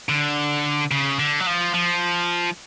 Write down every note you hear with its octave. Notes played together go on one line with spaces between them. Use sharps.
D3
C#3
D3
F#3
F3
F3